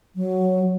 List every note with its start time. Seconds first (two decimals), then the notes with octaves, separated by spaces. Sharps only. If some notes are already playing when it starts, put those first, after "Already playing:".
0.16 F#3